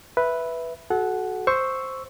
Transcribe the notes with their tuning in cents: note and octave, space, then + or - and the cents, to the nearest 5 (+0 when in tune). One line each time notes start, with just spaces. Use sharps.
B4 +0 E5 +0
F#4 +0 A4 -35 F#5 +0
C5 +0 C#6 +0 E6 +0